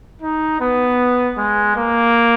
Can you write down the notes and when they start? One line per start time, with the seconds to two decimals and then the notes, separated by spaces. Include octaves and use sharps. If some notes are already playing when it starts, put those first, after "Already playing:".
0.22 D#4
0.61 B3
1.38 G#3
1.76 A#3